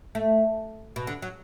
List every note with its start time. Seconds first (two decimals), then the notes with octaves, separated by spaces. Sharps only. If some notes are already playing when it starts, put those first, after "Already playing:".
0.15 A3
0.96 B2
1.07 D3
1.22 F#3